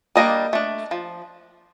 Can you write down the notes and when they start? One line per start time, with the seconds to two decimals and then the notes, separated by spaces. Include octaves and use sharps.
0.16 G3 A#3 D4 D#5
0.53 A3 D4
0.91 F3